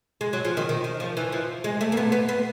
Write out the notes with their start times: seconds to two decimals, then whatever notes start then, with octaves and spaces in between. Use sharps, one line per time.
0.21 G#3
0.33 F#3
0.45 F3
0.57 D#3
0.69 D#3
0.84 D#3
1.00 F3
1.17 E3
1.32 F3
1.64 G#3
1.81 A3
1.92 A#3
1.97 B3
2.12 B3
2.29 B3